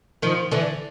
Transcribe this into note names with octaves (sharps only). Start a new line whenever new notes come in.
D#3 F3
D3 E3